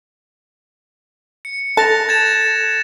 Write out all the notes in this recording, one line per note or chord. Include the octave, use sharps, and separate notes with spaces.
C#7
A4 A5 F#6 A#6 F7
G#6 A6 E7